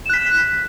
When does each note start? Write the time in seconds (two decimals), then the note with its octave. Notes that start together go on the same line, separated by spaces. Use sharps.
0.06 E7
0.09 F#6
0.13 B6